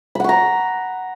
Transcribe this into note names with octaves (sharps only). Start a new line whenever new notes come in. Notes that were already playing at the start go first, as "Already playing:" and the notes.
F#5 A#5 B5 C#6